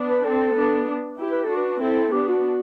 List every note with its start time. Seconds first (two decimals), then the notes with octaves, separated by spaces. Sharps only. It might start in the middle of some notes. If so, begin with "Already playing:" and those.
Already playing: B3 D4
0.09 B4
0.25 C4 A4
0.56 B3 D4
1.18 E4 G4
1.31 B4
1.44 A4
1.50 D4 F#4
1.56 B4
1.81 C4 E4 A4
2.12 B3 D4 G4
2.28 F#4